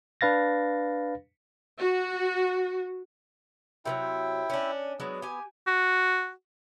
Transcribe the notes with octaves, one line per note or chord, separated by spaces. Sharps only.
D4 B4 F5 A6 A#6
F#4
C3 D#3 F#3 E4 E5 G5
C#4 D4
F#3 G#3 B3 D4
G4 G#5
F#4